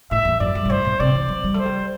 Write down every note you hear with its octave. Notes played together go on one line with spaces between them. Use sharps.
A2 E5
E2
F#2 D5
G2
B2
A2 C5
B2
C3 D5
E3
F#3
G3
A3 C5
G3